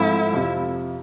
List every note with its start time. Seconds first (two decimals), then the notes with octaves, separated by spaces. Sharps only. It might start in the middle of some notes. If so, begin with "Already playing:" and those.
Already playing: G#2 F3 A3 C4 E4
0.33 F2 C3 F3